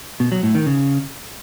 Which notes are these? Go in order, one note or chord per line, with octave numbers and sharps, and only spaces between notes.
B2
F#3
A2
D#3
C#3